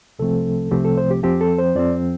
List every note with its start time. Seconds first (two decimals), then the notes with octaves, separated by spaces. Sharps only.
0.19 C2 C3 F3 A3 C4 A4
0.71 C2 C3 F3 A3 C4 G4
0.85 A4
0.97 C5
1.11 G4
1.23 F2 F3 C4 G4
1.41 A4
1.58 C5
1.75 F2 F3 C4 D5